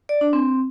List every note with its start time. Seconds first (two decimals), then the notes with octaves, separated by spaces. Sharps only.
0.09 D5
0.21 D4
0.33 C4